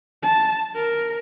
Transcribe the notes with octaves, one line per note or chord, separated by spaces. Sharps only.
A5
A#4